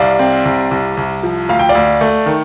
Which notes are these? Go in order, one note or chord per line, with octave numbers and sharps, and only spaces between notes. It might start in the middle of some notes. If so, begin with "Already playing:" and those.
Already playing: C2 D5 F5
C4
C2
C2
C2
F3
D2 F5
G5
D5 F5
D2
A3
D#3